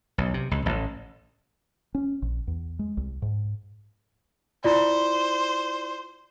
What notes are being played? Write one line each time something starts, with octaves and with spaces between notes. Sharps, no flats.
B1
C3
C#2
A1
C#4
A#1
E2
G#3
C2
G#2
E4 F4 C5 D5